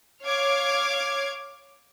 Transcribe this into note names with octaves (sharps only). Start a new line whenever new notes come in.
C#5 F5 D6 F6 G#6